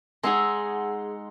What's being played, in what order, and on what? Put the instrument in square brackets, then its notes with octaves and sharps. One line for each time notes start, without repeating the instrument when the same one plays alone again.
[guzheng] G#3 D#4 G#4 [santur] F#5 C6 E6